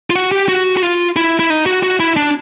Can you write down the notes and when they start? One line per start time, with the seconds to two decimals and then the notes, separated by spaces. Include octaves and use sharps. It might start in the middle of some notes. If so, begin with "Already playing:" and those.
0.10 F4
0.15 F#4
0.32 G4
0.48 F#4
0.77 F#4
0.83 F4
1.16 E4
1.39 E4
1.50 D#4
1.66 F#4
1.83 F#4
2.00 E4
2.17 D4